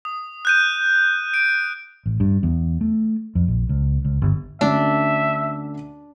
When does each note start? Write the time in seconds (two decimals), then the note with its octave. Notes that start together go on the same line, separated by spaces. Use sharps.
0.05 D#6
0.45 F#6 G6 D#7
1.34 D7
2.06 A1
2.20 G2
2.43 E2
2.81 A3
3.35 F2
3.48 A#1
3.69 C#2
4.05 C#2
4.22 G1
4.61 D2 D3 C#4 D4 E5